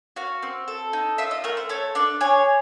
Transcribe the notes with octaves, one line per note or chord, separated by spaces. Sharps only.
F#4 F5
C4
A4
D#4
F4 E5
D#5
A3 A#4
C5
A4 C#5
D4 D5
G#4 C#5